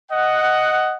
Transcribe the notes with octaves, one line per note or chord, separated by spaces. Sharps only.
D#5 F#5